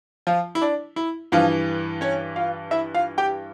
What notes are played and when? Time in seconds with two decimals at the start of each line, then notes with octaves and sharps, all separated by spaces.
0.27 F3 F4
0.55 E4
0.62 D4
0.96 E4
1.32 G2 E3 F3 F4
2.01 C#4 C#5
2.36 F4 F5
2.71 E4 E5
2.95 F4 F5
3.18 G4 G5